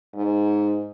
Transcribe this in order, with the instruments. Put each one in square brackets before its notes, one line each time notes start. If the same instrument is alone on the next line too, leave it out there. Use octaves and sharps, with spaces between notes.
[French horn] G#2